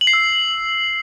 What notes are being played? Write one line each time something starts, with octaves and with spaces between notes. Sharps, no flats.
F#7
C7
E6